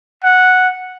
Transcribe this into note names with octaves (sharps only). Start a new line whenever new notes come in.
F#5